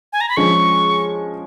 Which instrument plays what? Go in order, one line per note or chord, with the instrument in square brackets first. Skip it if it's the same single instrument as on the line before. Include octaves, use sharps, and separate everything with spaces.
[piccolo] G#5
A#5
B5
[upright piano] F3 G#3 C#4 [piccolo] C#6